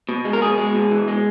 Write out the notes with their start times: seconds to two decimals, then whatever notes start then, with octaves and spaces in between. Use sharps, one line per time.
0.09 B2
0.25 G#3
0.33 A#4
0.41 B2 G#4
0.58 G#3
0.75 B2
0.91 E3
1.08 G#3